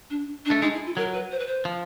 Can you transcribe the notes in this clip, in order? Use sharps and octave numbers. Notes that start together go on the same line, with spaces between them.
D4
D4
A3
G#3 D#4
E4
F4
F#3 A#4
B4
C5
B4
C5
F3